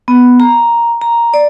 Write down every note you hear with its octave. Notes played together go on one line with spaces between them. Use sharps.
B3
A#5
A#5
D5